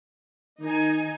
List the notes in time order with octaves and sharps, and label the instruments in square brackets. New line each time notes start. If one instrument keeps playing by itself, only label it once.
[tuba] D#3 [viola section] D#4 G#5